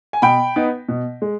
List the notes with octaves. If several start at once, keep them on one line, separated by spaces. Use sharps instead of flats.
G#5
B2 G5 B5
B3 D#4
B2
G#3